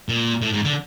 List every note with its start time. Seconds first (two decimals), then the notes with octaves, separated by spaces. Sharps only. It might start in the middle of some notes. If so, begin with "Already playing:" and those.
0.09 A#2
0.42 A2
0.53 G#2
0.64 D3